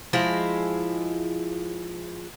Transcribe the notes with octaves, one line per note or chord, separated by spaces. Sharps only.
F3 G#3 E4 D#5